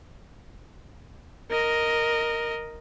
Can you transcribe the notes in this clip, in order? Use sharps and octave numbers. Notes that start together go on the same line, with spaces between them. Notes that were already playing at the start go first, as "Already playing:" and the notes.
A#4 D#5